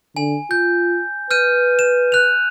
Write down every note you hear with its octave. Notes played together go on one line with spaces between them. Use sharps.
D3 G#5
F4 G6
B4 F6 G6 D#7
E7
F#6 F7